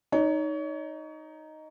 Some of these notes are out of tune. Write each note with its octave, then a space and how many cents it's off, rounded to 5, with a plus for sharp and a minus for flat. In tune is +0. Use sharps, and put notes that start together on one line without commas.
D#4 +0 C#5 +30